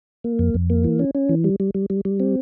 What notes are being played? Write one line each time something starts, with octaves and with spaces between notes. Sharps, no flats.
A#3
F2
F2
A#3
E3
C#4
C#4
E3
G3
G3
G3
G3
G3
C4